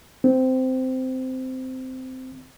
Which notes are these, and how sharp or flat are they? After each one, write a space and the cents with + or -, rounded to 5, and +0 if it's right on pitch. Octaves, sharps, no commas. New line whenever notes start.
C4 -15